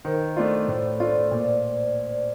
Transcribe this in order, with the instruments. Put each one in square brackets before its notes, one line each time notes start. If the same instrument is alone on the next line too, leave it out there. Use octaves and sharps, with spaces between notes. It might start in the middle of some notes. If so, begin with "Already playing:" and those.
[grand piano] D#3 [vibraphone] C5
[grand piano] A3 D4 F4 [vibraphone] D5
[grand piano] A2 [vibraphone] C5
[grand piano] A3 D4 F4 [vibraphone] D5
[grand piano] A#2